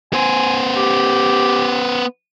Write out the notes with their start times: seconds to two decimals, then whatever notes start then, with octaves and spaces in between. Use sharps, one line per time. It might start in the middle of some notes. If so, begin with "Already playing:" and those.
0.13 B3 C5 G#5
0.75 G4